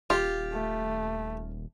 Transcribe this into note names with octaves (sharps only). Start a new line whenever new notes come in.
D#1 F4 G4
A3